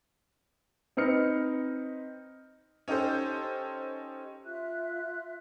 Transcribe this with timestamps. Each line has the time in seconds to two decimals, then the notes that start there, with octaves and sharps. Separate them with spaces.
0.97 C4 D#4 B4 F6 C#7
2.88 C#4 D#4 G4 A4 C5
4.45 F4 E5 F#6